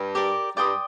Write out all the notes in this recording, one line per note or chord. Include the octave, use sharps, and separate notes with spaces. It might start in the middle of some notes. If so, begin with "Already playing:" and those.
Already playing: G2 G3
G4 A#4 D5
G2 G3 D5 G5 C6 D#6